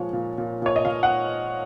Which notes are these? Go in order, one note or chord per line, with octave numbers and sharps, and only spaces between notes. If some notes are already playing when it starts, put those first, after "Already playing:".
Already playing: A#2 F3 G#3 C#5
A#2
A#2
A#2 C#5
D#5
A#2 F5
F#5